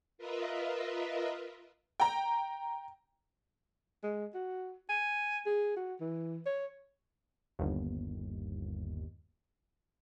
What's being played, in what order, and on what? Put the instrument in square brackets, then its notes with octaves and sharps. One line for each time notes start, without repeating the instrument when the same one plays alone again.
[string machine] F4 A#4 B4 D#5 E5
[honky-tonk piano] G5 A#5
[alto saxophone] G#3
F#4
G#5
G#4
F#4
E3
C#5
[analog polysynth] G1 D#2